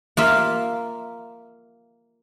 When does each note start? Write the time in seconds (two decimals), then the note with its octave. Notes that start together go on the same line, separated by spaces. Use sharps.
0.17 A#3 F4 E5